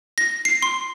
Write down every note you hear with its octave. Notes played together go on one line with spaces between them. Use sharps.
A#6
C7
C6